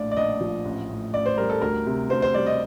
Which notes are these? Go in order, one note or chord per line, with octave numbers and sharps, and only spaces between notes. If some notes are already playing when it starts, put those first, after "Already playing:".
Already playing: A#1 A2 D5
D5
A#1 D#5
F3
A1
A2
A1 D5
C5
G3 A#4
A4
D2 A#4
C3
D2 C5
C5
G3 D5
D#5